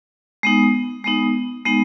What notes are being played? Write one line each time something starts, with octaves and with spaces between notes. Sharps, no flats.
G#3 B3 D#4
G#3 B3 D#4
G#3 B3 D#4